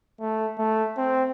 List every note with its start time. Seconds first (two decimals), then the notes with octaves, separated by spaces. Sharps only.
0.20 A3
0.59 A3
0.97 C4